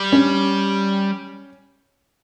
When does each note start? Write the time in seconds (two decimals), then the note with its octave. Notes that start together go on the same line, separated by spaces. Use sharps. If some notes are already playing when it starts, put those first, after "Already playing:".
Already playing: G3
0.12 C#4